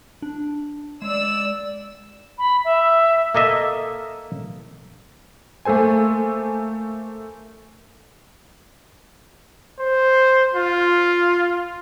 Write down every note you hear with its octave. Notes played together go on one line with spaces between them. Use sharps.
D4
G#3 D5 E6
B5
E5
A#3 A4 D#5 E5
A3 A#3 A4 C5 G#5
C5
F4